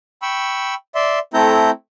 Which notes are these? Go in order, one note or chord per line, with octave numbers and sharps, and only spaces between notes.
G5 B5 C#6 E6
D5 E5 C6
A3 C4 E4 A4 A#5 G6